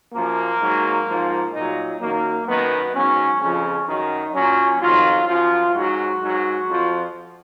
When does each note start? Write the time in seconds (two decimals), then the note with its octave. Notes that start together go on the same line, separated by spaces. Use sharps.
0.13 F#2 F3 A#3
0.61 G#2 F#3
1.07 G#2 F3
1.54 A#2 F#3 D#4
2.01 F#2 D#3 F#3 A#3
2.48 F#2 D#3 F#3 B3
2.95 G#2 F#3 C#4
3.41 F2 C#3 F3 C#4
3.88 F#2 D#3 F#3 D#4
4.34 A#2 F#3 C#4
4.82 F2 D#3 F#3 F4
5.28 F#2 F3 F4
5.74 G#2 F#3 F#4
6.21 G#2 F#3
6.68 F2 F3